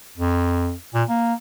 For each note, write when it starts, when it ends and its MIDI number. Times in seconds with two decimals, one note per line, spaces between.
0.18 0.73 41
0.94 1.04 46
1.09 1.33 58